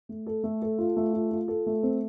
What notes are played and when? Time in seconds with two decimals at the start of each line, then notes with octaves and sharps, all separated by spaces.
0.09 A3
0.26 A4
0.44 A3
0.62 A4
0.79 F4
0.96 A3
1.13 F4
1.31 F4
1.48 A4
1.66 A3
1.83 C4